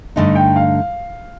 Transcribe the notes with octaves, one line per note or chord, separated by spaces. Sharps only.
G2 D3 A3 D#4 D#5
G5
F5